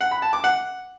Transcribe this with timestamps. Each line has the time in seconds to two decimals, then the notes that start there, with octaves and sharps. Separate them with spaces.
0.01 F#5
0.11 B5
0.22 A5
0.33 D6
0.44 F#5